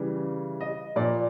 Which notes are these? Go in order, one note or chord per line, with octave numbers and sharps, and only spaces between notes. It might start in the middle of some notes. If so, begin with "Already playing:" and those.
Already playing: C#3 E3 G3
D#5
A#2 F3 D5